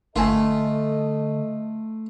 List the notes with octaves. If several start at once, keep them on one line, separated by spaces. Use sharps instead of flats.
G1 D3 A3 F4 A4 D#5 G#5